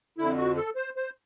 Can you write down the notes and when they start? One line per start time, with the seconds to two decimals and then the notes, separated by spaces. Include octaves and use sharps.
0.18 F2 D3 E4
0.38 F#4
0.57 A4
0.76 C5
0.96 C5